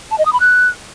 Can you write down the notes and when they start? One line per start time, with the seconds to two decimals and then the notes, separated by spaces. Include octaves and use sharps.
0.11 A5
0.18 D#5
0.25 D#6
0.33 B5
0.40 F#6